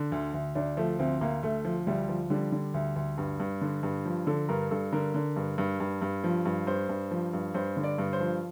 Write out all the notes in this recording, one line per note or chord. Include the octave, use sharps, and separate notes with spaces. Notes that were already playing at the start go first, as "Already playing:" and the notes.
Already playing: D3
D2
D2
D2 D4
F3 A3
D2 C4
D2 A#3
D2 A3
F3
D2 G3
F3
D3 G3
D3
D2
D2
G2
G2
D3
G2
F3
D3 A4
G2 A#4
G2 A4
D3 A#4
D3
G2
G2
G2
G2
F3
G2
G2 C5
G2
F3
G2
G2 C5
D3
D5
G2
C5
F3